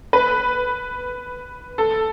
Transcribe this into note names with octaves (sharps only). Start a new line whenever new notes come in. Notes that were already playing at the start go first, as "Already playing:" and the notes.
B4
A4